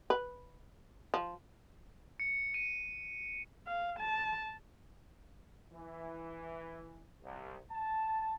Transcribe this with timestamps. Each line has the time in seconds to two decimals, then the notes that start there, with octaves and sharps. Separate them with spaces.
0.10 B4
1.14 F3
2.20 C#7
2.54 D#7
3.67 F5
3.99 A5
5.72 E3
7.23 C2
7.71 A5